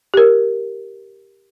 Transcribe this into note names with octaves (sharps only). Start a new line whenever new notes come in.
G4 A#4